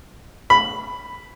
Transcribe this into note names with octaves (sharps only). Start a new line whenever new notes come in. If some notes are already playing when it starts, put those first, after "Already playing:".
B5